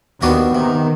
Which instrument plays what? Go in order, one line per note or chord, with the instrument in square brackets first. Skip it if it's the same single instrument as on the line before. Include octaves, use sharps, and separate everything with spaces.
[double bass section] D#2 [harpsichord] D#3 D4 F#4 [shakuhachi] B3
[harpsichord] C3 [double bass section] D#3